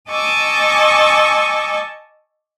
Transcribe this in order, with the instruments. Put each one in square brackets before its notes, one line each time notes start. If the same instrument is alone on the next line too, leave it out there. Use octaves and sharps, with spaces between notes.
[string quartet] D#5 G#5 A5 C#6 D6 E6